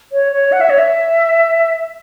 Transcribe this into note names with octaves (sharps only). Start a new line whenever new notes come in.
C#5
C#5
F#5
E5
C#5
E5